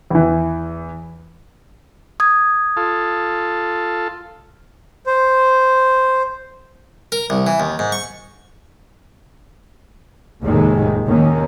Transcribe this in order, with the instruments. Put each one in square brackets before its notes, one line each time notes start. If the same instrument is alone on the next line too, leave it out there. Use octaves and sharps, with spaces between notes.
[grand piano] E2 E3
[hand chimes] D#6 G#6
[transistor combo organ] F4 A4
[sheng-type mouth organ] C5
[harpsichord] A#4
C2
E3
D#2
G#2
C#6
[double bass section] F1 D#2 A2 D#3 G#3
D#2 D#3 A#3 C#4